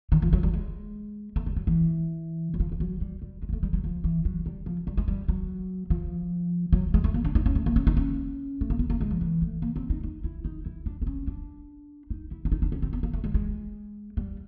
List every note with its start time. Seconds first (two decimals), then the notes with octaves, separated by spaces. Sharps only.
0.12 D#3
0.22 F3
0.33 F#3
0.43 G3
0.54 G#3
1.36 A3
1.46 G3
1.56 F#3
1.67 E3
2.54 F#3
2.60 F3
2.72 F3
2.80 F#3
3.01 G3
3.22 G3
3.42 G#3
3.49 A#3
3.53 A3
3.63 G3
3.73 F#3
3.84 F3
4.04 E3
4.25 F#3
4.46 G3
4.66 F3
4.87 G3
4.97 G#3
5.08 G3
5.28 F#3
5.90 F3
6.72 F#3
6.94 G#3
7.04 A3
7.14 A#3
7.25 D4
7.35 D#4
7.46 C#4
7.55 A3
7.66 A#3
7.76 C#4
7.87 D#4
7.97 C#4
8.61 A3
8.70 A#3
8.79 B3
8.90 A#3
9.01 G#3
9.11 F3
9.21 E3
9.42 A3
9.62 A#3
9.76 C4
9.90 D#4
10.04 D#4
10.24 E4
10.45 D#4
10.66 E4
10.86 D4
11.02 C4
11.07 C#4
11.27 D4
12.10 D#4
12.31 E4
12.45 D4
12.52 D#4
12.62 D4
12.72 C#4
12.82 C4
12.93 B3
13.03 A#3
13.13 A3
13.24 G#3
13.34 G#3
14.17 G3